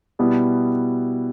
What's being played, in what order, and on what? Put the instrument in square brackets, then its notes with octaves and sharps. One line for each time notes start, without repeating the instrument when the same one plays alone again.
[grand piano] B2 G3 B3 E4